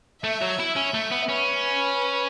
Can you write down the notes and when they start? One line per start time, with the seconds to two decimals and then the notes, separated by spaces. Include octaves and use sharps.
0.24 A3 E5
0.41 F#3
0.59 E4
0.76 C#4
0.94 A3
1.11 B3
1.29 C#4 B4